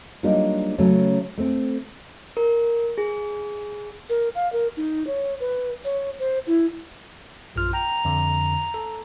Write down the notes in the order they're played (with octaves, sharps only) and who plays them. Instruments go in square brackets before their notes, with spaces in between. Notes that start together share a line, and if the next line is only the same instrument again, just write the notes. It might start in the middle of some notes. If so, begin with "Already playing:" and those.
[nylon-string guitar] F#3 G3 A#3 D4 D#4 F4
C#3 F#3 A3 C#4
A3 C4
[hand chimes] A#4
G#4
[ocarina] A#4
F5
A#4
D#4
C#5
B4
C#5
C5
E4
[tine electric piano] A#1 F#2 F6 [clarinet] F4
[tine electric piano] G5 [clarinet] A#5
[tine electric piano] F2 D3
A4